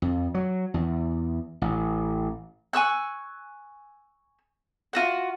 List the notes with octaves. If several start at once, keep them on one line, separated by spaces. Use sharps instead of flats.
F2
F#3
E2
A1
G#5 C#6 E6 F#6
F4 F#4 F#5